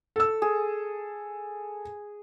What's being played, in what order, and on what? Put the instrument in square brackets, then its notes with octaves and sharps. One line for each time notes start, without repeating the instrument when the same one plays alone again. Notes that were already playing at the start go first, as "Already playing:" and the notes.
[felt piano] A4 E6
[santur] G#4